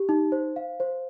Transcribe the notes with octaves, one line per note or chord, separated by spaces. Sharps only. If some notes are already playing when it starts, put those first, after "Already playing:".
Already playing: G4
D#4
C5
F5
C5